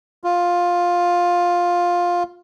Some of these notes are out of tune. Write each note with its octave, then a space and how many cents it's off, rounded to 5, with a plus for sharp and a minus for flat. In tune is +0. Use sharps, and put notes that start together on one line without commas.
F4 +10